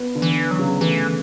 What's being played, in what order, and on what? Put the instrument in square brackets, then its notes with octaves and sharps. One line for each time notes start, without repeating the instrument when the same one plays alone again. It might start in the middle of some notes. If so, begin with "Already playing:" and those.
Already playing: [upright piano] B3
D3
[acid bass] E3
F#3
[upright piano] C#3
[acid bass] E3 [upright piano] A3